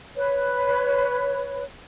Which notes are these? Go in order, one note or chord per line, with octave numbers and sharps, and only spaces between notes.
B4 C#5